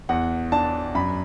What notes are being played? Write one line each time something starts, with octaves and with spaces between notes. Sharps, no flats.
E2 F#5
D4 A5
F#2 B5